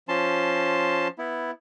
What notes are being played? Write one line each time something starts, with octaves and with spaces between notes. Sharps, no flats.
F3 C#4 A5 C6
B3 E4